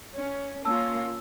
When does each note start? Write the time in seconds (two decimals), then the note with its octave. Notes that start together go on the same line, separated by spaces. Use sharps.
0.15 C#4
0.65 A#3 C#4 F4 A5 E6